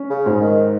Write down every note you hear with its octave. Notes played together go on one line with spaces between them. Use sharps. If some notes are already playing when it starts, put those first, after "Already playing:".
Already playing: C#4
C#3
G#2
D#3